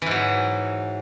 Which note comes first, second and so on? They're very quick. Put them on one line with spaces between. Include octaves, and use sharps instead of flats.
E3 G#2 F#3